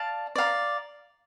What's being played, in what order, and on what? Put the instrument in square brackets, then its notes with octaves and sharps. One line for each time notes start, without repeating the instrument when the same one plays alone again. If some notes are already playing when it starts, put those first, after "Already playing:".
Already playing: [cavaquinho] D5 F5 A5
D5 F5 A#5